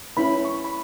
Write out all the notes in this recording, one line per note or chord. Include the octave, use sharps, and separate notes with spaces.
C#4 E4 B4 B5
C#6
B5